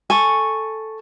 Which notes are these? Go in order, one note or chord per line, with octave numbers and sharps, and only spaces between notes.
A4 G#5 C#6